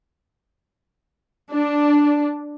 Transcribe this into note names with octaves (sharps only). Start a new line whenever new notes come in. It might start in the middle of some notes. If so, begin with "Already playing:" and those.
D4